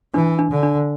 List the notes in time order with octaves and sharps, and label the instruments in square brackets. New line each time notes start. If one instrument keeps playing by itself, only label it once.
[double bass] E3 [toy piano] D4
[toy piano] D4
[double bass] D3
[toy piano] D4